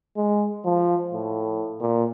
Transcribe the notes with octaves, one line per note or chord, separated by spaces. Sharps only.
G#3
F3
A2
A#2